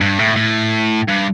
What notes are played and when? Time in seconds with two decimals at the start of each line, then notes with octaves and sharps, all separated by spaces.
0.01 G2
0.19 A2
0.36 A2
1.08 G2